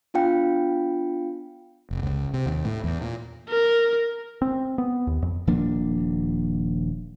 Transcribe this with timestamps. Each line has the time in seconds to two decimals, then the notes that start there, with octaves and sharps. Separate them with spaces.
0.14 B3 D4 F4 F5 G5
1.91 F1
2.03 C#2
2.34 C3
2.46 D#2
2.65 A2
2.84 E2
3.01 A#2
3.49 A#4
4.42 C4
4.78 B3
5.07 D#2
5.22 F2
5.47 D#1 F3 A#3 D4